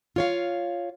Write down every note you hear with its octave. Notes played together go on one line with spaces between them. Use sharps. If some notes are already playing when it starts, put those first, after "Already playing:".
F4 C#5 F5